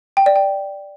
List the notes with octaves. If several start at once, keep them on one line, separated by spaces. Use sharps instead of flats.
G5
D5
G5